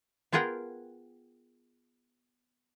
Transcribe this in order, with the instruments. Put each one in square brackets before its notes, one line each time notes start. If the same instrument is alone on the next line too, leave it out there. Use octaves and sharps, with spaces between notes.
[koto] B3 F4 G#4 A#4 F#5 G5